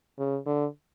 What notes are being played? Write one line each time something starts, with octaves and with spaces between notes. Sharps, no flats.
C#3
D3